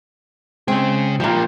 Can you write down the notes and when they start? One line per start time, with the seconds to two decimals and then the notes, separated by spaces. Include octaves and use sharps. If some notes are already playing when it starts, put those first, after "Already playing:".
0.68 C#3 G#3 C4 G#4
1.20 A#2 F3 G3 A#3